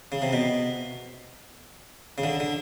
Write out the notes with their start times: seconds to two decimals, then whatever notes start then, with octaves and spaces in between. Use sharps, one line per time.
0.12 C#3
0.22 C3
0.33 B2
2.18 C#3
2.24 D3
2.40 D3